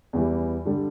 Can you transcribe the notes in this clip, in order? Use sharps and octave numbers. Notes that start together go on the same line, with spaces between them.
E2 E3 G3
G2 D3 G3